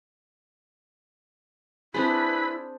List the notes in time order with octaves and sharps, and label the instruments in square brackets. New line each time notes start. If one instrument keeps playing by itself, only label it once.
[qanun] C4 D4 G#4 [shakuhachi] E4 [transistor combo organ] B4 B5